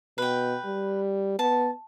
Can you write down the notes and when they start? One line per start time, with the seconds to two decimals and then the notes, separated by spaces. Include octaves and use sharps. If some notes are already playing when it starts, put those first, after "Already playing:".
0.18 B2 B4 G5
0.65 G3
1.39 B3 A5